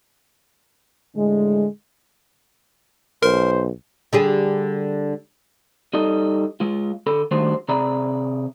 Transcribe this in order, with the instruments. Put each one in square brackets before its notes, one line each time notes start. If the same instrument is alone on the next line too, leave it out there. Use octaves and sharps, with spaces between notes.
[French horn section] A2 D3 G#3
[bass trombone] B1 [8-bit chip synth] A#4 [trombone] C5
[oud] D3 G3 G#4
[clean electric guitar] G3 D#4 A4 D#5
G#3 F4
D3 A4 B5
D#3 G3 A3 D4 F#4 C5
C3 G#4 D5 E5 A#5 B5